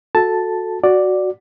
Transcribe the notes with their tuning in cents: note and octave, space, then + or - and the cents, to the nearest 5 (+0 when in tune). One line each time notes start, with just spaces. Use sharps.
F#4 -20 A4 +0 A5 +0
F#4 +0 D5 +0